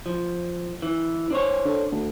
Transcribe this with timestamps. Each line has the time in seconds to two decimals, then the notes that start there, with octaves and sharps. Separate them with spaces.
0.06 F3
0.82 E3
1.31 D4 C5 C#5
1.65 D3
1.92 D2